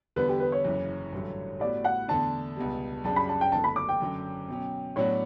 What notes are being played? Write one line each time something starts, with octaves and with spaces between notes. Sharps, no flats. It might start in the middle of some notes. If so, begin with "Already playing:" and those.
E2 D3 G3 B3 B4
G4
B4
C#5
F#1 F#2 C#3 E3
A1 G2 D3 F#3 A3
A2 G3 B3 F#4 D5
F#5
E2 D3 A3 D4 A5
C#2 B2 G3
F#2 C#3 G3 D4 G4 A5
B5
A5
G5
F#1 E2 D3 A3 D4 A5
B5
D6
G5
F#2 D3 F#3 C#4
B2 F#3 C#4
A2 F#3 B3 D4 F#4 C#5